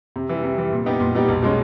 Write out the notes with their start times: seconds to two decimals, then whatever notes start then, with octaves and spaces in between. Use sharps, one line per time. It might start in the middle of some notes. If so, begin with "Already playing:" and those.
0.16 C3
0.29 E3 G3
0.43 C3
0.58 E3 G3
0.72 A#2
0.86 G3 B3 D#4 G4
1.00 A#2
1.15 G3 B3 D#4 G4
1.28 B1
1.42 B2 G#3 C#4